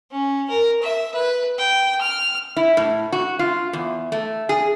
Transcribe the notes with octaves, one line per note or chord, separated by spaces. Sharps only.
C#4
A#4
E5
B4
G5
F6
E4
A2
F#4
F4
E2
A3
G#4